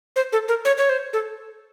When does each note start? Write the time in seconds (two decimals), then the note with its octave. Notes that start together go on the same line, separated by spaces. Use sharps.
0.16 C5
0.33 A4
0.48 A#4
0.65 C#5
0.77 C#5
0.89 C5
1.13 A4